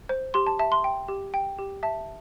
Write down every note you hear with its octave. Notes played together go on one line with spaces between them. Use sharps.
C5
G4 C6
A5
E5 A5
C6
G5
G4
G5
G4
E5 A5